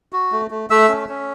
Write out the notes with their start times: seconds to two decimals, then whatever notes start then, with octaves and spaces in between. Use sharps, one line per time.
0.13 F#4
0.32 A3
0.51 A3
0.70 A3 E5 E6
0.89 C#4
1.09 C#4